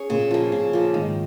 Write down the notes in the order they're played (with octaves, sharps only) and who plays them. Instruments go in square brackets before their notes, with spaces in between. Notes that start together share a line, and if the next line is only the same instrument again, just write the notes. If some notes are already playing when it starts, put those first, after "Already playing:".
Already playing: [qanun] C#4 G#4 C#5
[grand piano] A#2 [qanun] C#3
[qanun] F3 A#3
[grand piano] A#2 [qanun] C#3
[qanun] F3 A#3
[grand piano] G#2 [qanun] D#3